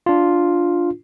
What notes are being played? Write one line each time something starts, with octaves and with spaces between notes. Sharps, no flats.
D4 F4